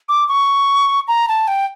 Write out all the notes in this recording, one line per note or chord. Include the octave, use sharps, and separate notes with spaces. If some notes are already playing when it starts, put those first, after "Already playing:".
D6
C#6
A#5
A5
G5